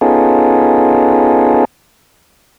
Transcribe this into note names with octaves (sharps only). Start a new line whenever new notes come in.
B3 C#4 D#4 F4 G#4 A4